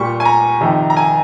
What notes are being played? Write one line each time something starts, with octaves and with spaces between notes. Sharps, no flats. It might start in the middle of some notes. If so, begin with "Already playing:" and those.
Already playing: A#2 G3 C#6
G#5
A#5
F2 C3 D#3
A#5
G#5